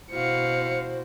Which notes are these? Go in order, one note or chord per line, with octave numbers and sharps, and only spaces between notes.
B2 E4 F#4 C5 F5 C#7